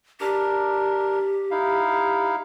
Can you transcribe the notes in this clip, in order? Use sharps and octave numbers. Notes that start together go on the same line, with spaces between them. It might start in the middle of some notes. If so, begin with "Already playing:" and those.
D4 G4 A#4
D#4 E4 F5